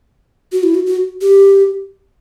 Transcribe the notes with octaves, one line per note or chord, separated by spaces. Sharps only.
F#4
E4
F#4
F#4
G4